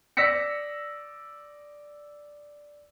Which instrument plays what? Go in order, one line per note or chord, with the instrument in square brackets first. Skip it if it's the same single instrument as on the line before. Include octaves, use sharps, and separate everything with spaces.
[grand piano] D5 E6 A#6 B6 C#7